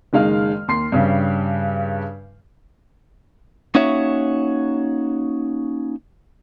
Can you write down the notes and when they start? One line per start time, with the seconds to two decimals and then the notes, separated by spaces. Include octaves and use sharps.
0.13 F#1 D#3 G#3 F5 F6
0.68 D#2 C6 C7
0.92 G2 C#3 G3
3.75 A#3 C#4 D#4 F#4 C#5 E5